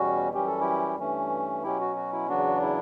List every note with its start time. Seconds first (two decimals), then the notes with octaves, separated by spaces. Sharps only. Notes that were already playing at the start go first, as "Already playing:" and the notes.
Already playing: E2 B2 G3 C#4 F#4
0.34 F#2 E3 G3 C#4 G4
0.47 A4
0.61 E4 G4
0.99 G2 E3 A3 C#4
1.63 B2 F#3 C#4 E4 G4
1.81 F#4
1.96 F#4
2.12 E4
2.29 E2 C#3 F#3 B3 D4 F#4
2.61 E4